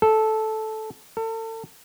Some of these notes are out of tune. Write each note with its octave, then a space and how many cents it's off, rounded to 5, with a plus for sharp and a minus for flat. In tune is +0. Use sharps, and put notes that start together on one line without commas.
A4 -10
A4 +35